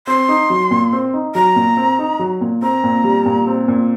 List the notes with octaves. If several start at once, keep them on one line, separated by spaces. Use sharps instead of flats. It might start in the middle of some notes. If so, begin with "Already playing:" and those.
C4 C6
D#4
F#3
A#2
C4
D#4
F#3 A#5
A#2
C4
D#4
F#3
A#2
C4 A#5
A#2
G3
A#2
C4
A#2